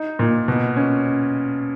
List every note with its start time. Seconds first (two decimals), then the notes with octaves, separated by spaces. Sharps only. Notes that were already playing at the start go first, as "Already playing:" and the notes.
Already playing: D#4
0.19 A#2
0.48 B2
0.76 C#4